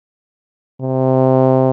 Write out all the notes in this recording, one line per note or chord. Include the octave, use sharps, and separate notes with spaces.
C3